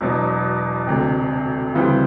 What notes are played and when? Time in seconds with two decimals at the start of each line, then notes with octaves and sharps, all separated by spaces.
0.01 E1 E2 B2 F#3
0.87 E1 D2 C3
1.75 D2 C#3 E3 G3 C4